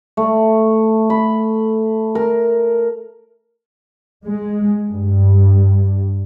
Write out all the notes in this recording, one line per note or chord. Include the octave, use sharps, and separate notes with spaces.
A3
B5
A#4
G#3
G2